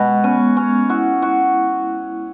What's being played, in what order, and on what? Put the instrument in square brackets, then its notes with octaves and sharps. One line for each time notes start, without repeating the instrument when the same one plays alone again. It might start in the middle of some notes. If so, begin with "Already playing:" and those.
Already playing: [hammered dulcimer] B2 F#4 [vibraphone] G#3
[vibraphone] B3 [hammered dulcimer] C#4
[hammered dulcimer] C#4
[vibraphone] E4 [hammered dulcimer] F#4
[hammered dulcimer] F#4